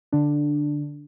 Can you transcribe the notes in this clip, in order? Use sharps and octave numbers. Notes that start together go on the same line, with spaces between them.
D3 D4